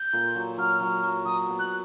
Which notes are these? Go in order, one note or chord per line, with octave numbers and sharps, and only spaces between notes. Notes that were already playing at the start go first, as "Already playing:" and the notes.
Already playing: G6
A#2
F#3
F#3 F6
F#3
F#3
F#3 D#6
B3
F#6